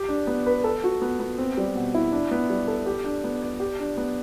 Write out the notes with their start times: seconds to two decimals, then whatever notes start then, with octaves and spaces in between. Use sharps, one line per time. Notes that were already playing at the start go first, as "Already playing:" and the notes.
Already playing: G4
0.09 D4
0.27 B3
0.46 B4
0.64 A4
0.84 F#4
1.01 B3
1.20 B3
1.38 C4
1.57 G3
1.75 B2
1.95 E4
2.12 D4
2.31 B3
2.50 G3
2.68 A4
2.86 G4
3.04 D4
3.24 B3
3.42 D5
3.60 G4
3.79 D4
3.97 B3